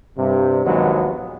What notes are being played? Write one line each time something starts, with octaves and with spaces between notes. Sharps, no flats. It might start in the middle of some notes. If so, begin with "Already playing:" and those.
G2 C3
A#1 D#2 D#3 F#3 G#3 B3